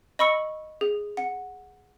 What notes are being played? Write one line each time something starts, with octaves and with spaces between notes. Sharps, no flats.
D#5 B5 C#6 E6 C#7
G#4
F#5